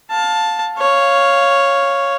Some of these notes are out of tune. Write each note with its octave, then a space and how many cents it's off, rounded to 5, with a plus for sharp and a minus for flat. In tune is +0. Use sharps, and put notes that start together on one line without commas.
F5 +25 A5 +0
C#5 +0 F5 +0